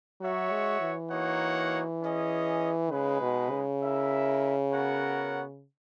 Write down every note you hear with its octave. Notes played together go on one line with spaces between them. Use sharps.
F#3 F#4 C#5 E5
G#3
E3
A#3 D#4 F#4 C#5 F#5
C#4 G#4 D#5
C#3 G#3 D#4 G#4 B4
B2
C#3
E4 A#4 E5
B3 F#4 A#4 C#5 F#5